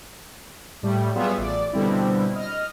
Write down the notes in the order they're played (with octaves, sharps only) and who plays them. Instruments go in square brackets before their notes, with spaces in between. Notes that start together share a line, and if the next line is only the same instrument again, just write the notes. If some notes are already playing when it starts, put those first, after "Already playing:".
[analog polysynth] A2 G3 A3
F#3 G3 B3 F4 G#4 E5
A1 D5
B2 D3 G3 C4 E4
D#5 F6